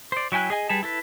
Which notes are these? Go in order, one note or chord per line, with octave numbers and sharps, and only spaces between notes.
C5 D5
F#3 E4 G5 G#5 F#6
G#4 D#5 G#5
G3 G#4 B4 A5
E4 A4 B4